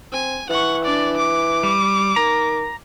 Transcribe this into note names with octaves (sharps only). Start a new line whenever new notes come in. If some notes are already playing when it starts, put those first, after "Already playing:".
C4 G#5
E3 F#5 C#6
D4 D5
D6
G3
D#3 A#5